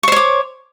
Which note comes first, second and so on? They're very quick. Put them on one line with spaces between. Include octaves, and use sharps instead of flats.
C#6 C5 C#5 D6